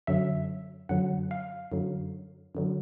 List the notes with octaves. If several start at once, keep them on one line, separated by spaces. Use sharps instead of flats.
F#2 D3 F#3 E5
F#2 D3 F#3 F#5
F5
F#2 D3 F#3
F#2 D3 F#3